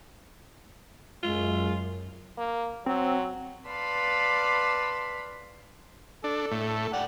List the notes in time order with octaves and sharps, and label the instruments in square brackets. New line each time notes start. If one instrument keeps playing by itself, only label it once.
[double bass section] F#2 [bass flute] G#3 [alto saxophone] F4
[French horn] A#3
[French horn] F#3 [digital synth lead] C4
[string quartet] B4 D5 F5 A5 B5 C6
[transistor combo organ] D4 [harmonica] A4
[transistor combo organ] A2
[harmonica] D5 F#5 G5